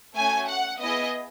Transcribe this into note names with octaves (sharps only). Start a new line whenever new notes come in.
A3 C#4 F#4 G#5
F#5
B3 E4 G#4 D#5